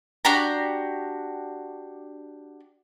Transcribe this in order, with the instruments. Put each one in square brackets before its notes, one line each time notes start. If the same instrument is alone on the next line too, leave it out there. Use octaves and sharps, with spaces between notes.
[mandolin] D4 F#4 G4 A#5